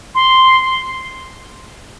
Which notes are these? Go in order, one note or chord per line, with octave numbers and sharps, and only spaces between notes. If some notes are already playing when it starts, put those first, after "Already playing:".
C6